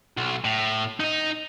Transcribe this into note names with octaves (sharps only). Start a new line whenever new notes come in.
B1
A2
D#4 D#5